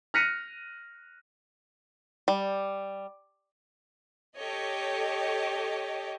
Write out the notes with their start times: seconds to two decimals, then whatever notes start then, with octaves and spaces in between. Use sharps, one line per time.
0.14 F6 F#6 A#6 B6 C#7 D#7
2.28 G3
4.37 G4 A4 C#5 D#5